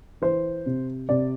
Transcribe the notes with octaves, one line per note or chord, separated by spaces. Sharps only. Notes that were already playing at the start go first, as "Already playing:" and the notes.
E3 C5
C3
C3 D5